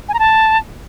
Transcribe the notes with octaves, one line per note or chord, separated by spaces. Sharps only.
G#5
A#5
A5